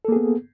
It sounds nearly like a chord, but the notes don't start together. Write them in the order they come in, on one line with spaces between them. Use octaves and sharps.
A4 A#3 G#4 B3